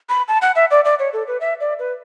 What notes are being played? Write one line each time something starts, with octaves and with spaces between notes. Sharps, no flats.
B5
A5
F#5
E5
D5
D5
C#5
A4
B4
E5
D5
B4